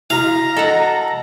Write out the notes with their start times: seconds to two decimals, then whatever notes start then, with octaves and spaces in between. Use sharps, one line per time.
0.10 E4 F#4 F5 A#5
0.56 A4 D#5 F#5